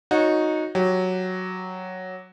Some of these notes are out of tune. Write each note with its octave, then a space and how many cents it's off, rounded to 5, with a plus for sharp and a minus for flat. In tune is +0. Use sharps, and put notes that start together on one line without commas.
D#4 +0 F#4 -20 C#5 +0
F#3 +0 G4 +0